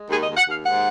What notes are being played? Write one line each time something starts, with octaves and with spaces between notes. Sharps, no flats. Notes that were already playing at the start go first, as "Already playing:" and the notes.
Already playing: G#3
D#2 G#4
D#5
D#2
F#5
D#2
F5
G#2 F#5